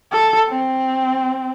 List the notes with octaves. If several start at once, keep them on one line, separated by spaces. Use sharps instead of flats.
A4
C4